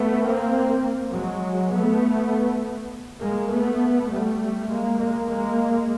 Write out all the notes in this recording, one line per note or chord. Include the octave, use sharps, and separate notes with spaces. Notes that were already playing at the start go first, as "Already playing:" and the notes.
Already playing: A3 B3
A#3 C4
F#3 G#3
A3 B3
G#3 A#3
A3 B3
G3 A3
G#3 A#3
G#3 A#3
G#3 A#3